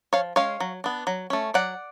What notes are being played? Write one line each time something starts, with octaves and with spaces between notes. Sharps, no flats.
F3 C#5 F5
G#3 C#4 C#5 F5
F#3
B3 D4
F#3
A3 C#4
F#3 D5 F#5